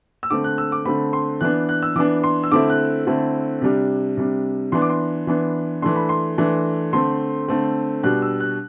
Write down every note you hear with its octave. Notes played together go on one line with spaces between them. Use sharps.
E6
D3 A3 C4 D6
F#6
E6
D6
D3 A3 C4 B5
C6
E3 B3 D4 F#6
F#6
E6
E3 B3 D4 D6
C6
E6
D3 A3 C4 E4 D6
F#6
D3 A3 C4 E4
C3 G3 D4
C3 G3 D4
E3 B3 D4 C6
D6
C6
E3 B3 D4
E3 A3 D4 C6
B5
C6
E3 A3 D4
D3 A3 C4 C6
D3 A3 C4
B2 G3 D4 F#6
E6
F#6